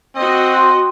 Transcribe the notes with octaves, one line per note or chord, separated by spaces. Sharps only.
C4 F#4 D#5
G5 C6 F#6